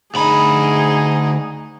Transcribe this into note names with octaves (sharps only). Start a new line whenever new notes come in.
D2 D#4 G#4 B5